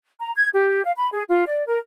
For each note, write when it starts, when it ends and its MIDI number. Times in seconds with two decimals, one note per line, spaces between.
0.20 0.31 82
0.36 0.49 92
0.54 0.84 67
0.84 0.93 77
0.97 1.07 83
1.14 1.23 68
1.29 1.45 65
1.47 1.65 74
1.67 1.78 70